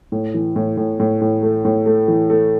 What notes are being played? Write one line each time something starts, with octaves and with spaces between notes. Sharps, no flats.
A2
E3
A2
A2
A2
A2
A3
A2
A3
E3
A3